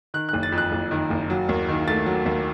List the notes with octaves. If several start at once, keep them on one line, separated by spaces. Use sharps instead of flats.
D#3 F#6
F#1 F#6
A6
F2
F#6
F#1
D#3
F#1
F#3
D#2
D#3
A3 A6
F#3
D#2